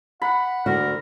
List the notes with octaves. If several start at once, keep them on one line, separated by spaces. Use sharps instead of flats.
F#5 B5
D2 D3 F#4 A#4